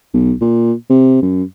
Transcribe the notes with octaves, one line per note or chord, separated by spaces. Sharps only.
B1
A#2
C3
F#2